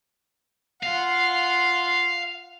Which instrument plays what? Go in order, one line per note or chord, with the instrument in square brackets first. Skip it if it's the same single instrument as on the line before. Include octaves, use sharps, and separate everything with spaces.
[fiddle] F4 F#5 [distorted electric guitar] F5